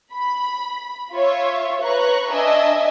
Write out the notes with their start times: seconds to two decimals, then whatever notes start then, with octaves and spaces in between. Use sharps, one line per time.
0.13 B5
1.12 F4 C#5 E5
1.82 B4 C#5 A#5 C#6 F#6
2.31 D4 D#5 E5 G#5 E6